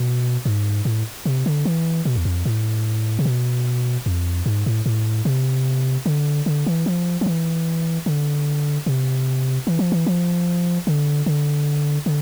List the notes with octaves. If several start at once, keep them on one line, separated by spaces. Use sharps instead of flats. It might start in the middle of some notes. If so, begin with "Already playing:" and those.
Already playing: B2
G#2
A2
C3
D3
E3
B2
E2
F2
A2
C3
B2
F2
G#2
A2
A2
C3
D3
D3
E3
F3
F3
E3
D3
C3
E3
F3
E3
F3
D3
D3
D3